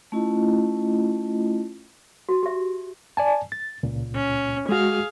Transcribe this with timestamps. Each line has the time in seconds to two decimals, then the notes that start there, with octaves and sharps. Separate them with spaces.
0.12 A3 C#4 E4 F4 D#5
2.29 F#4
2.43 G4 E5
3.17 D5 G#5 A5
3.52 A6
3.83 C#2 A#2
4.15 C#4
4.69 G#3 F#4 G#4 F5